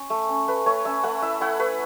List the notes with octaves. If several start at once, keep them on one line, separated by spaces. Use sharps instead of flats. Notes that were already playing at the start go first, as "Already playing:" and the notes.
Already playing: C#4
A3
C#4
A3 B4
A3 C#5
C#4 E5
A3 F#5
E4 E5
E4 F#5
A3 B4